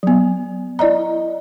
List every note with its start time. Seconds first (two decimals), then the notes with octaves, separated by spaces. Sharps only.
0.03 F#3 B3
0.79 E4 D5 D#5 A#5